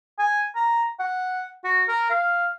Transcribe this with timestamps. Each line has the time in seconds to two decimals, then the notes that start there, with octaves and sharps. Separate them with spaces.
0.19 G#5
0.56 A#5
1.00 F#5
1.64 F#4
1.88 A#4
2.10 F5